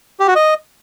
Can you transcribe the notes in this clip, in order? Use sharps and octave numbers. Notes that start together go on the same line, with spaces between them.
G4
F#4
D#5